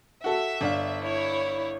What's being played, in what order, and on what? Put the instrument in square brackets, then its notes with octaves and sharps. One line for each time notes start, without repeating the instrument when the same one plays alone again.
[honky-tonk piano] F#4 A4 [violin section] E5
[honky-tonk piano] G1 D4 F5
[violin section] E4 C#5